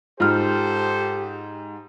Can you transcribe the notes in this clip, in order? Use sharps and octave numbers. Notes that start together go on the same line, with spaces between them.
G#2 F4 G4 A4 C5 F6